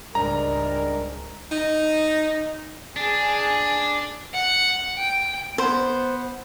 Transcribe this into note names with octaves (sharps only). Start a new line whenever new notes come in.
C#2 G#2 G3 G#3 D4 A#4 A#5
D#4
D4 G#4
F#5
G5
B3 C5